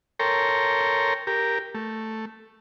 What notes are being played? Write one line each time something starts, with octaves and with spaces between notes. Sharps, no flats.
A4 A#4 C#5 G5 A#5 C6
G4 A#4
A3